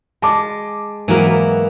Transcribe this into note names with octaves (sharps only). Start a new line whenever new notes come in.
G#3 A5 D6
G#2 E3 F#3 G#3 A#3 B3